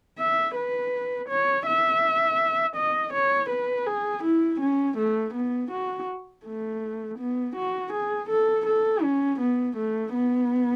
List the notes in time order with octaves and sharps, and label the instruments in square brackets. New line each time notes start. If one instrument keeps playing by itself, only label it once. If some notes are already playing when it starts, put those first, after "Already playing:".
[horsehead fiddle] E5
B4
C#5
E5
D#5
C#5
B4
G#4
E4
C#4
A3
B3
F#4
A3
B3
F#4
G#4
A4
A4
C#4
B3
A3
B3